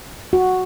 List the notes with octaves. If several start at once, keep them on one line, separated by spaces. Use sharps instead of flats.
F#4